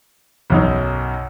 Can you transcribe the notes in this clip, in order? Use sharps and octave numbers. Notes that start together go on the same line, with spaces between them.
B1 F#2 D#4